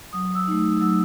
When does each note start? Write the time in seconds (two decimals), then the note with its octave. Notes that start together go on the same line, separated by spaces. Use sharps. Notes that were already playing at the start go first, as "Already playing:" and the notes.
0.13 F#3 D#6
0.35 E6
0.48 A3 D#4
0.81 F#3 E6